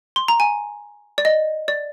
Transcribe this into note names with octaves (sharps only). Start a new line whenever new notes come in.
C6
A#5
G#5
D5
D#5
D5